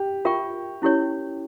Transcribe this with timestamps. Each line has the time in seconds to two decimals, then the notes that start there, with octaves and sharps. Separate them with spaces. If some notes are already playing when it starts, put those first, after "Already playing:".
Already playing: G4
0.25 F4 A#4 E5 G5 C#6
0.82 C#4 E4 G4 A#4 C#5